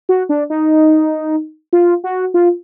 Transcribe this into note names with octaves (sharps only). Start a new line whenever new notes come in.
F#4
D4
D#4
F4
F#4
F4